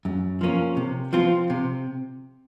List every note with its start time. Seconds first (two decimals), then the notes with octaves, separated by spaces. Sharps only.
0.05 F#2
0.41 F3 A#3 C#4
0.77 C3
1.13 F3 C4 F4
1.50 C3